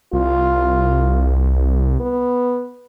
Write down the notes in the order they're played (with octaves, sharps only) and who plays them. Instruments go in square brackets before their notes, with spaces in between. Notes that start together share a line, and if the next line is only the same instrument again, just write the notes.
[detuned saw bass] C2 [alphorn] F4
[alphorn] B3